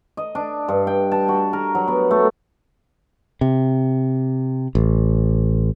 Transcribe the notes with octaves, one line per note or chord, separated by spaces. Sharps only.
D#5
D4
G2
G5
A5
F#4
A#4
F#3
B3
A3
C3
A1